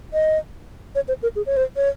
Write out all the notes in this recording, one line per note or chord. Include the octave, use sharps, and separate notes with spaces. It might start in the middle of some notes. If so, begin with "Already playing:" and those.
D#5
C#5
C5
A#4
G#4
C#5
C5
C#5